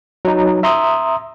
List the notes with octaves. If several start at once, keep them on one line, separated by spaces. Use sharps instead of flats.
F#3 D#4
E5 A#5 C6 D#6